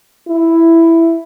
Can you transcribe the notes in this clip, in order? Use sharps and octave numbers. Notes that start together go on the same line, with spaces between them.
E4